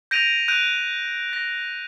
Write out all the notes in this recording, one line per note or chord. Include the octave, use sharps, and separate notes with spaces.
G6 A#6 D7 D#7 F7
F#6 G6 D7 D#7 F7
A#6